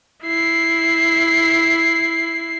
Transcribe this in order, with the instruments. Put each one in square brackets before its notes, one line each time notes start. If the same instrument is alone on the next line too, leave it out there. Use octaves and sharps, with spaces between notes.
[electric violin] E4 C7